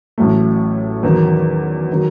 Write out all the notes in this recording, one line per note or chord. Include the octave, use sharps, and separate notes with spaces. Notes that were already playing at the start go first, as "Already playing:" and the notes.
A1 A2 F#3 A3
E2 D#3 F#3
D#3 F#3